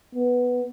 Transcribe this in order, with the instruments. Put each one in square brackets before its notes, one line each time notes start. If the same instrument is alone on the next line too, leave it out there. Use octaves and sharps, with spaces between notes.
[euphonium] B3